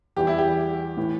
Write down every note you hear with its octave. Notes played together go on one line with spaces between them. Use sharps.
E2 E3 G3 G4
E4
G4
A2 E3